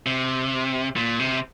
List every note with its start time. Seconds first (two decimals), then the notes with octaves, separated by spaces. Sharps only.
0.06 C3
0.96 A#2
1.19 C3